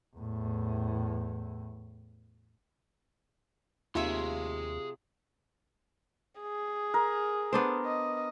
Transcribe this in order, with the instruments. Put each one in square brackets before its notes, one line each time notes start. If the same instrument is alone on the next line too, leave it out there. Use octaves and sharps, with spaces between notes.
[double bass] E2 A2
[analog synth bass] D#2 [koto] C3 C#5 E5 [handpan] F4 [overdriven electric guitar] G#4 C6
[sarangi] G#4
[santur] A#4
[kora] B3 D4 C5
[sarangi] D#5